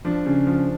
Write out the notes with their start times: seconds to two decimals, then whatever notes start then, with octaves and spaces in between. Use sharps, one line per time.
0.05 F3 D4
0.26 C#3
0.47 F3